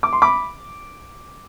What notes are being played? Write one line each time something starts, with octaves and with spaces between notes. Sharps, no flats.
D6
C6
B5 D6